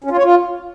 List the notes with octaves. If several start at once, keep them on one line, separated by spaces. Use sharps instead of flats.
C#4
F4
C#5
F4